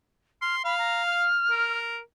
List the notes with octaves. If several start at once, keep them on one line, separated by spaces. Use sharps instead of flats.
C6 F6
F5 B5
A#5
F6
A#4